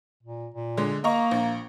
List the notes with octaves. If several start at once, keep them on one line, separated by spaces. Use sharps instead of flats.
A#2
A#2
D3 G#3
A#3 D#5 A#5 C#6
A#1